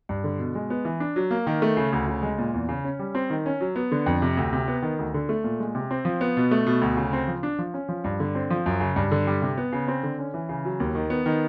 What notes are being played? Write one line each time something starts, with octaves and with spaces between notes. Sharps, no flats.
G2
D3
B2
G#3
B3
E3
D4
F#3
A#3
D#3
A3
C#3
D2
C#3
G#3
A#2
E2
C#3
C#4
G3
C4
D#3
C#4
F#3
B3
D3
F2
C3
D2
C3
B3
D#3
D2
D3
A3
A#2
G#3
C3
C4
F3
B3
B2
A3
B2
D2
C#3
C4
F3
D4
F3
C#4
F3
G2
D3
C4
F3
F#2
C#3
G2
D3
G3
C3
B3
C#3
C4
D3
C#4
E3
C#3
F#3
D#2
D#3
B3
D#3